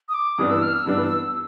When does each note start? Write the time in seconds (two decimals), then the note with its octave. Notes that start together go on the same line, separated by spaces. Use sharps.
0.09 D#6
0.14 D6
0.38 G2 E3 G3 B3 D4 D#6
0.50 E6
0.62 F6
0.74 E6
0.86 G2 E3 G3 B3 D4